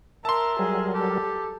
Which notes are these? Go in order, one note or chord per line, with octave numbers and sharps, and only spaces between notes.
A#4 E5 A5 C6
F#3 G3 G#4 A#4
G4 A4